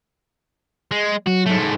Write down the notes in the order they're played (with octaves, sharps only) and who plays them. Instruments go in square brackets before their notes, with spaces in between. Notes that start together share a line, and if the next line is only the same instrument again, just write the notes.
[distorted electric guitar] G#3
[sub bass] F#3 [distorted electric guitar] F#4
[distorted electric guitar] G#2 A3